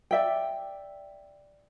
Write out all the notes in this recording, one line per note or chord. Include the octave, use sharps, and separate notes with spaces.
D5 E5 G5